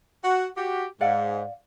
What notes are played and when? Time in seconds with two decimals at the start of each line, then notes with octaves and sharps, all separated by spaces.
0.24 F#4
0.56 F#4 G4
1.01 G#2 D5 F5 F#5